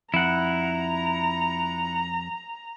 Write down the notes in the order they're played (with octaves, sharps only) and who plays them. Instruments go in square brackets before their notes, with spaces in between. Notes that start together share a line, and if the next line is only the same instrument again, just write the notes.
[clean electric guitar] F2 [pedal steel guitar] E4 F#5 [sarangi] A#5